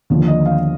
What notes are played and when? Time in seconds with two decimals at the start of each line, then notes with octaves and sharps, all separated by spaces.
0.10 D#2 D3 F3
0.28 D#5
0.46 F5